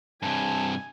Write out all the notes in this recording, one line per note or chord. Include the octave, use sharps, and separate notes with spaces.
G2 C3 G#5 A5